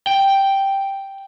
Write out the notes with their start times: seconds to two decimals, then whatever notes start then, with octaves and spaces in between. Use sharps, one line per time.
0.07 G5